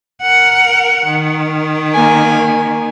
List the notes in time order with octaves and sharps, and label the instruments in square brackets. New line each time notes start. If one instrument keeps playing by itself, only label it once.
[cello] A#4 F#5
D#3
[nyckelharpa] A#3 G#5